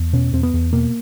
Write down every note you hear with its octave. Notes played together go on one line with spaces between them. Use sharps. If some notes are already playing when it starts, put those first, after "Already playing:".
Already playing: E2
B2 C#4
E2 C4
B3
E2
B2 A#3